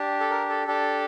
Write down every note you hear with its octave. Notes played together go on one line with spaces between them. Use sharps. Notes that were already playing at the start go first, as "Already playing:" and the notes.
Already playing: D4 G4
A4
A#4
A4
D4 G4 A4